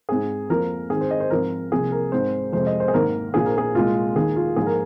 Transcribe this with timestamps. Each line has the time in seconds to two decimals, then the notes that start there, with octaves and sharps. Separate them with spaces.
0.09 G#2 G#3 C4 G#4
0.49 F2 F3 A#3 A#4
0.90 G#2 D#3 C4 G#4
1.01 C5
1.11 D#5
1.20 C5
1.30 G#2 F3 C4 A#4
1.71 C2 C3 F3 A#3 G#4
1.92 A#4
2.12 G#2 G#3 C4 C5
2.53 F2 C3 G#3 C5
2.66 D#5
2.80 C5
2.88 G#4
2.93 G#1 G#2 D#3 A#3 A#4
3.34 A#1 A#2 F3 G#4
3.46 A#4
3.58 G#4
3.74 C2 A#2 G#3 F4
4.15 D#2 D#3 A#3 G#4
4.36 F4
4.56 G#2 F3 A#3 G#4
4.66 A#4